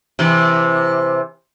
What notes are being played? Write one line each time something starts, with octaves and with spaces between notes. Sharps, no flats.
C3 E3